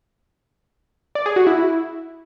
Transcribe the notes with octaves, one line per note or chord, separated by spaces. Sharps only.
D5
G#4
F#4
E4